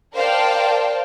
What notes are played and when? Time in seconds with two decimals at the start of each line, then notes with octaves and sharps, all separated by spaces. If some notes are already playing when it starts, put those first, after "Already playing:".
0.14 A#4 C5 D5 F5 G5 A5